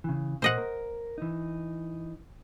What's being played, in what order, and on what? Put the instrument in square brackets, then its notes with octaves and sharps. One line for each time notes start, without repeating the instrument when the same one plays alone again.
[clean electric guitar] C#3 E3
[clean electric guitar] A#2 A#3 [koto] C5 D#5 F#5
[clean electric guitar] A#4
E3 D#4